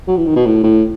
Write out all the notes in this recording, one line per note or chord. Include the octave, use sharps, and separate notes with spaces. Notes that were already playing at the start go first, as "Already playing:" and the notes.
F#3
E3
D#3
B2
A2
A2